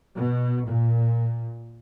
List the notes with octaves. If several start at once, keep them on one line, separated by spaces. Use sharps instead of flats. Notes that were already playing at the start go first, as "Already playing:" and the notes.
B2
A#2